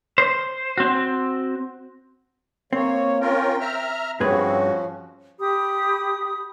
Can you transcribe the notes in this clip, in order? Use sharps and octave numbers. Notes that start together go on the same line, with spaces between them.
C5
C4 F#4
A#3 C4 C#5
C#4 F4 A#4 G5
E5 A#5 F6
G2 F3 C4 C#4 F#4 G#4 B4
G4 B5 D#6